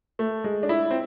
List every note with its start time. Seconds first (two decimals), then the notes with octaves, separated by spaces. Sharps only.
0.19 A3
0.44 G#3
0.63 D4
0.69 E4
0.91 C4